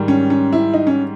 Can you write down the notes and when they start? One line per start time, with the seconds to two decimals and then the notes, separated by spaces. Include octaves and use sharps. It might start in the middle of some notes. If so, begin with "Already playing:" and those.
Already playing: G#2 D#3 G3
0.08 C#4
0.30 C#4
0.52 E4
0.74 D#4
0.87 C#4